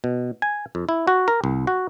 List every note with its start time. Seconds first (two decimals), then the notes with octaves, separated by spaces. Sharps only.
0.04 B2
0.42 G#5
0.75 F2
0.89 E4
1.07 F#4
1.28 A#4
1.44 C2
1.67 F#4